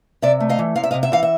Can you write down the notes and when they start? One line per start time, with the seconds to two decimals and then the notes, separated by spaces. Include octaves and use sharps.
0.22 C3 D5 E5
0.40 A3
0.49 D#5 F5
0.59 E3
0.76 C3 F5
0.84 E5
0.91 C3 D#5 F5
1.03 E5
1.12 E3 F5
1.23 E5